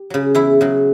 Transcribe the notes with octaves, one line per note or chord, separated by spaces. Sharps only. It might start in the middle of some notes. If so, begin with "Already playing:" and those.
Already playing: G4
C#3 F#3
E2 E4
C#3 F#3